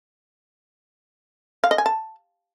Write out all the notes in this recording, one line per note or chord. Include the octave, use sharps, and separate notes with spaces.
F5
D#5
G#5
A5